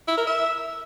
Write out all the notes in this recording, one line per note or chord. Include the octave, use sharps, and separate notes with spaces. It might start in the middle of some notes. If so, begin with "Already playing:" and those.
E4
A#4
E5